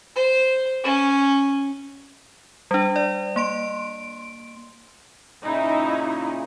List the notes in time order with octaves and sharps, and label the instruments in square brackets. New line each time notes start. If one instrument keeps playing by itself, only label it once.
[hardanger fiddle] C5
C#4
[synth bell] G3 D4
D5
A#3 C6 D7
[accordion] A#2 C#3 [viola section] D#4 E4